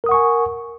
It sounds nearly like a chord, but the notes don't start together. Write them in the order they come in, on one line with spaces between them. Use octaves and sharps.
A#4 D#6 F#5 C#6 G#5